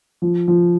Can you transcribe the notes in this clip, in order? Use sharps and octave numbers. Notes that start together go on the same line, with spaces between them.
F3
F3